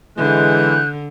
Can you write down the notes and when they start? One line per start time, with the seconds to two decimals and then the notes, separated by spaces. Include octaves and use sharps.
0.17 D3 E3 G#3 F#6 G6